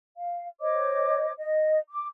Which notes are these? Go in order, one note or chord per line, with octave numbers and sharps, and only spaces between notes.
F5
C5 C#5 D#5 D6
D#5
D6